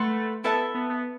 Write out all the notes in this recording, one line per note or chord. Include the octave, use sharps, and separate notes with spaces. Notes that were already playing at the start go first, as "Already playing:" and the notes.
Already playing: A3 B4 F#5 C6
B3 E4 A4 E5 A5
B3
B3